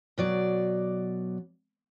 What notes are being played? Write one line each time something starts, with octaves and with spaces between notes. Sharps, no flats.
B2 F#3 D5